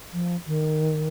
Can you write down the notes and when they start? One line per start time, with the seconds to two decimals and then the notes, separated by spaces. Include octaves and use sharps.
0.13 F3
0.47 D#3